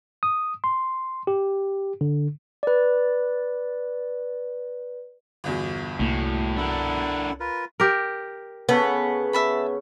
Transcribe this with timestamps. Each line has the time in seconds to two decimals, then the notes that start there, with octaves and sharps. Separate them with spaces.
0.23 D#6
0.64 C6
1.27 G4
2.01 D3
2.63 B4 D5
5.44 G1 E2 B2
5.99 C2 A2 A#3
6.57 D4 E4 A4 A#4 F#5
7.40 F4 A#4 B4
7.80 G4 A#4
8.69 C#3 B3 A4 C#5
9.33 E5 A5 B5